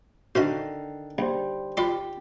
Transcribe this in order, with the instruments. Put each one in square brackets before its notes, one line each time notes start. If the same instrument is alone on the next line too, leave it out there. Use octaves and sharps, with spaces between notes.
[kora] D3 D#3 F5 [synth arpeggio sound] F#4 D#5 [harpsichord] C5 F#5 B5
[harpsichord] A#1 [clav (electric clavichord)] G3 C5
[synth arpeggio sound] F4 B5 C7 [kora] G4 [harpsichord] D5 C6 D6